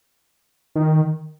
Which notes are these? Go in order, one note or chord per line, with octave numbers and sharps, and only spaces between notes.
D#3